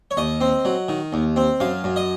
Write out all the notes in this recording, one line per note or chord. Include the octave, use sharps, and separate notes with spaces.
C#5
D#2 D#5
C4
F#3
D#3
D#2
C4
F#2 F5
F#2
D#5